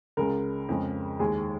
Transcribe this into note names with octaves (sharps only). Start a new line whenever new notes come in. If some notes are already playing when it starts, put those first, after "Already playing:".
C#2 C#3 G#3 A#4
F2 C#3 G#3
D#2 D#3 G#3 G#4